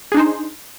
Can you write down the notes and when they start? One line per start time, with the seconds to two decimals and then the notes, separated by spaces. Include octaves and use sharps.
0.12 G#4
0.14 D4
0.17 D#4
0.19 C5